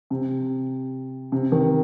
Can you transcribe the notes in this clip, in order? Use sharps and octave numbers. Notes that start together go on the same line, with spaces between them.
C3
C3
D#3